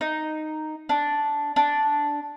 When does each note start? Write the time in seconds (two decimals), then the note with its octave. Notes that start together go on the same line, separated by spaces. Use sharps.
0.01 D#4
0.89 D4
1.56 D4